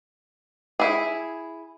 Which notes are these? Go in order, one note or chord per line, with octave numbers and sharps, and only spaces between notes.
E4 G#4